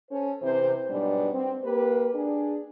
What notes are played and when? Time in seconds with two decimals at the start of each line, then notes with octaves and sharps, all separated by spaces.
0.11 C#4 A4 C5
0.42 C3 E3 C5
0.90 G#2 B2 F#3 G3 B3 D4
1.33 C4
1.64 A#3 G4 B4
2.14 D4 G#4